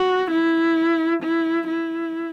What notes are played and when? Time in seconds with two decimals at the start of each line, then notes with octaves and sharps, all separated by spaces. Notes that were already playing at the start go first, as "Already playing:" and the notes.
Already playing: F#4
0.31 E4
1.23 E4
1.67 E4